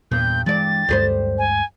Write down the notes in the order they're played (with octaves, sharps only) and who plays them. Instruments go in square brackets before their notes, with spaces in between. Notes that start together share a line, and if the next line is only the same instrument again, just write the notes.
[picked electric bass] E2 A#2 B3 [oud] G2 [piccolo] G6
[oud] G2 D5 [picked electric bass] E3 G#3 [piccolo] A6
[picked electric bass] D2 G2 G#3 [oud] G3 G#4 C5
[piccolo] G#5